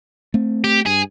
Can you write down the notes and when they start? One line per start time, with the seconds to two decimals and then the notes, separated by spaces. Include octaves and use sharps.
0.34 A3 C4
0.64 G4
0.86 G2 G#4